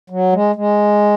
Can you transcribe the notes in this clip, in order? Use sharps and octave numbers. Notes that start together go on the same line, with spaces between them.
F#3
G#3
G#3